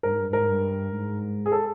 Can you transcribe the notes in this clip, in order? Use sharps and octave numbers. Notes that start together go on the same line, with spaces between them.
G2 A#4
G#2
G2
G2
G#2 A#4
G2
G#2
G#4
A4